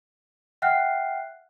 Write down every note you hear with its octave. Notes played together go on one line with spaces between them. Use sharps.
E5 F#5 G5 F6 F#6 C7